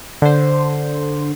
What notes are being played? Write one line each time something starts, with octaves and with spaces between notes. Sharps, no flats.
D3 C5